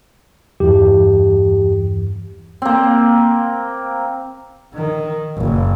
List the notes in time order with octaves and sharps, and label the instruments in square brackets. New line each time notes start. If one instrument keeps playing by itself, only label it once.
[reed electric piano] E2 G2 E3 [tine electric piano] G4
[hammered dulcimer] A#3 C4
[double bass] D#3
F#1